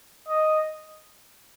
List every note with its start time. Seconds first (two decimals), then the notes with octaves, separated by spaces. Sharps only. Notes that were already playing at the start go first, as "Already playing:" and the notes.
0.29 D#5